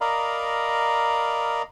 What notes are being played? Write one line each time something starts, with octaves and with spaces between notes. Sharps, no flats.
A#4 D5 D#5 F5 A#5 B5